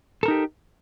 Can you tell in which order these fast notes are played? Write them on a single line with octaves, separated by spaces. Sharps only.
A4 A#4 D#4 G4